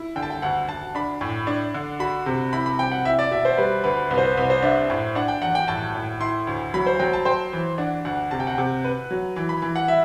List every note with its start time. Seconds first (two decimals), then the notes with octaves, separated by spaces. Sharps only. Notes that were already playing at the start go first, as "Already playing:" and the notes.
Already playing: E4
0.16 D3 G5
0.23 A5
0.30 G5
0.42 D2 F#5
0.69 D2 A5
0.95 D4 B5
1.21 A2
1.47 D4
1.74 D3
2.00 F#4 B5
2.26 C3
2.53 E4 B5
2.66 B5
2.79 C3 G5
2.92 F#5
3.05 E4 E5
3.19 D5
3.31 B2 E5
3.45 C5
3.57 G3 B4
3.84 D2 B4
4.11 C2 B4
4.18 C5
4.23 B4
4.37 C2 B4
4.50 C5
4.62 D4 E5
4.90 A2
5.15 D4 F#5
5.28 G5
5.42 E2 F#5
5.55 G5
5.68 A2 A5
5.95 A2
6.20 E4 C6
6.47 D2
6.74 F#3 B5
6.86 C5
6.99 F#3 G5
7.13 A5
7.25 C5 G5
7.53 E3
7.78 D4 F#5
8.05 D2 F#5
8.31 C3 A5
8.40 G5
8.47 F#5
8.55 C3 G5
8.84 B4
9.11 F#3
9.36 E3
9.49 B5
9.62 E3
9.76 F#5
9.88 E5